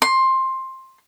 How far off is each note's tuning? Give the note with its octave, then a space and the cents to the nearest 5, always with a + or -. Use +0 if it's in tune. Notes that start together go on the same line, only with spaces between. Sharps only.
C6 +15